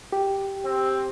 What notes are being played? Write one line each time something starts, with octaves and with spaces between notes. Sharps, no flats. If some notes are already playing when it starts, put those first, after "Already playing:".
G4
C4